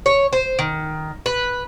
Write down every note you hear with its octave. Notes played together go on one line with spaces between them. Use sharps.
C#5
C5
D#3
B4